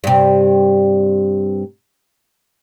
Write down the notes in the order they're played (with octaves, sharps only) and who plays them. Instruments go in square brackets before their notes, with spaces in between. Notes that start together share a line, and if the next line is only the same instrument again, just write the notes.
[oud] G2 C3